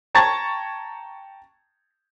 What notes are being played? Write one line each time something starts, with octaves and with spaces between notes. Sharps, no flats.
G5 A5 A#5 C#6 G#6 A6